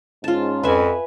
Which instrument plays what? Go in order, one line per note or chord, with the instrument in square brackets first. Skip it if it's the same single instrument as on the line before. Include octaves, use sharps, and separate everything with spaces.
[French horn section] G#2 C#4 [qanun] F4 A5
[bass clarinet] F2 [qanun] B4 E5 G#5